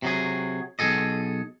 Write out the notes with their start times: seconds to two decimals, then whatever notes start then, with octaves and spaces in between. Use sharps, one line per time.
0.02 C3 F#3 G#4
0.79 B1 G#2 G#4 A4 D#5